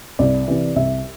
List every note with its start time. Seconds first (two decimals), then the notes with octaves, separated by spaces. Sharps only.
0.19 C2 D5
0.48 C3 E3
0.76 C2 E5